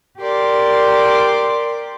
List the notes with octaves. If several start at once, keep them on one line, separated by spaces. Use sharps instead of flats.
G4 A#4 D5 C6